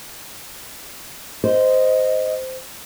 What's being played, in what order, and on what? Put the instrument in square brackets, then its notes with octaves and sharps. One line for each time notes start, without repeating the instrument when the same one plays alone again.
[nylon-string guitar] C5 [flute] D#5